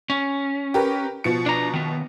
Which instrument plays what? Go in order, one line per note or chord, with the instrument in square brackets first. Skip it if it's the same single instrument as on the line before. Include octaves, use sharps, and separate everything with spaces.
[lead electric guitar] C#4
[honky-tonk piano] G4 A#4 B4
B2 F3 C#7
[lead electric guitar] D4 A#5
D#3 B3